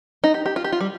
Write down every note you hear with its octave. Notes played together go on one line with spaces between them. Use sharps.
D#4
G4
G4
F4
G4
F4
G3